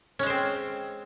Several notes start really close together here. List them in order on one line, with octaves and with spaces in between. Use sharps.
C#4 G#3 C5 C4